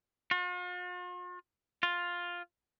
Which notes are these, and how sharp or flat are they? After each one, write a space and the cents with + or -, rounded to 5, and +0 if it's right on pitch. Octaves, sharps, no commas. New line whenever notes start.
F4 +45
F4 +5